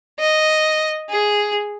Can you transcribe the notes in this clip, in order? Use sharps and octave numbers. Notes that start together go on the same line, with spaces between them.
D#5
G#4